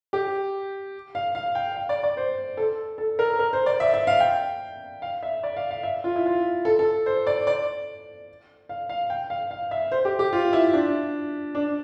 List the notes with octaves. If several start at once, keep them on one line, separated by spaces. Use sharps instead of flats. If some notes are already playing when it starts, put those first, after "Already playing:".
G4
F5
F5
G5
F5
D5
D5
C5
A4
A4
A#4
A#4
C5
D5
E5
E5
F5
G5
F5
E5
D5
F5
F5
E5
F4
E4
F4
A4
A4
C5
D5
D5
F5
F5
G5
F5
F5
E5
C5
G4
G4
F4
E4
D4
D4